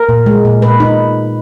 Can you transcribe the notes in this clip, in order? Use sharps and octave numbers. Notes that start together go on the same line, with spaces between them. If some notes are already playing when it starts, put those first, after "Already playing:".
Already playing: A#4
A#2
G#3
A#2
A#2 B4
D#4